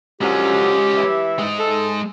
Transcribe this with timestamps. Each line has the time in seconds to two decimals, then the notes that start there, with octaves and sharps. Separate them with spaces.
0.21 F#2 D3 F3 G#3 C#4 G4
0.97 E3 E4 E5
1.39 G#3 D#4
1.58 A4